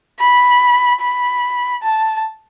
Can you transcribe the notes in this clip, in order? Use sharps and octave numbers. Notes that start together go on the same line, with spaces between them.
B5
B5
A5